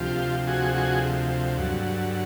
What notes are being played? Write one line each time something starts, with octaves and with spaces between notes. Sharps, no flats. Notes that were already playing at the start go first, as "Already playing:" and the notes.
Already playing: D2 C3 F3 F4 G4
F#4 G#4
F#4 G#4
G2 D3 F#3